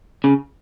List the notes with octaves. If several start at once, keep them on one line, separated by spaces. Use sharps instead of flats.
C#3